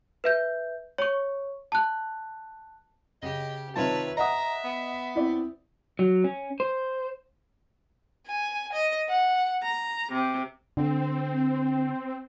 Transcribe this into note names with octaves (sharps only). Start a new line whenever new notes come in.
B4 E5 G6
C#5 C#6
A5 F#6
C#3 G4 D#5
C3 D#3 F4 B4 C#5 A5
D#5 E5 F#5 A#5 D#6
B3
C4 E4 D5
F#3
C#4
C5
G#5
D#5
F#5
A#5
C3
D3 C4